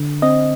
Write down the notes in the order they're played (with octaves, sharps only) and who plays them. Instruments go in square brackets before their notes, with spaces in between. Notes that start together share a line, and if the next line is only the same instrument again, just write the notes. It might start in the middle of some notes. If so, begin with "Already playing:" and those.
Already playing: [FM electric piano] D3
C4 D#5